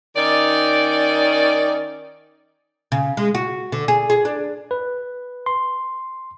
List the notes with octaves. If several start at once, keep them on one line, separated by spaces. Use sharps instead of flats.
D#3 C#4 D#4 D5
C#3
G#3
F#4
D3
G#4
G#4
D4
B4
C6